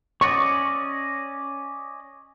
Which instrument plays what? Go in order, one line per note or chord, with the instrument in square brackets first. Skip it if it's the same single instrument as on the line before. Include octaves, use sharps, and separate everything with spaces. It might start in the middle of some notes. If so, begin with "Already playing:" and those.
[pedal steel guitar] C#4 D5 D#5 [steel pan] C#6